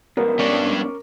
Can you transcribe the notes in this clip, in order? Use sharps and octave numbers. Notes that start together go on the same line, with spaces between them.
F2 G#2 B2 B3 A#4
G3 C#4 D4 C#6 D6